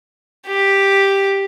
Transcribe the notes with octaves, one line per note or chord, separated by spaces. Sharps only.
G4